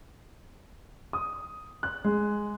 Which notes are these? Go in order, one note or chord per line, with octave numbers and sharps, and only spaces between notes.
D#6
F#6
G#3